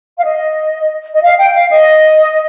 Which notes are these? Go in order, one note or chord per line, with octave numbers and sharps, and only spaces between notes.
F5
D#5
D#5
F5
G5
F5
D#5